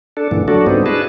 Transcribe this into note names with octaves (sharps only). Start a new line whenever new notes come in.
D4 A4
G2 A#2 D3 E3
D3 F#3 A3 D4 F#4 A4
G#2 D3 G3 B3 C4 D#4
D4 E4 F#4 G#4 B4 A5